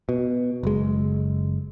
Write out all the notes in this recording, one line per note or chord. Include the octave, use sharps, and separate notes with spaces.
B2
F#1 G#3